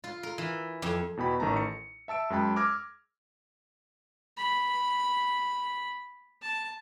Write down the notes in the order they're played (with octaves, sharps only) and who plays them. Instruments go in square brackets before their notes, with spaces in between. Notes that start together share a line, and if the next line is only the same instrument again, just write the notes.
[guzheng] F4
A#4
E3
F2
[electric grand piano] E2 B2 G5 B5
A1 D#3 A3 A5 A#5
C#7
E5 A5 E6 D7
F#2 G#3 G#4 G5 A5 B5
D6 E6 F6 G#6 A#6
[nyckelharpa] B5
A5